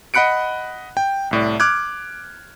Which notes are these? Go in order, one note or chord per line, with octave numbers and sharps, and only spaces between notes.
D#5 F#5 B5 F#6 C#7 D7
G5
C2 A2 D5
D6 F6 F#6 G#6